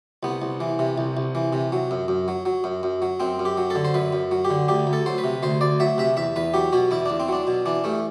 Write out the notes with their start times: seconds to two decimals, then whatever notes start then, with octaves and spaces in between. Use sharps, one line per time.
0.23 C2 B3
0.42 C2
0.60 E3
0.79 C3
0.98 C2
1.17 C2
1.35 E3
1.53 C3
1.72 F#3
1.91 F#2
2.08 F#2
2.28 F#3
2.46 F#3
2.64 F#2
2.83 F#2
3.02 F#3
3.20 F#2 C4
3.39 F#2
3.45 G4
3.57 F#3
3.70 D3 A4
3.85 C5
3.94 F#2 B4
4.12 F#2
4.31 F#3
4.45 G4
4.50 D3
4.68 D2 G4
4.87 D2
4.93 A4
5.06 F#3 C5
5.18 B4
5.24 C3
5.43 D2 C5
5.61 D2 D5
5.80 F#3 E5
5.98 C3 E5
6.17 E2 E5
6.36 E2 B4
6.54 F#3 G4
6.73 B2 F#4
6.91 E2 E4
7.06 E2 D4
7.20 C4
7.28 F#3 D4
7.47 B2
7.66 E3 D4
7.84 G2 A3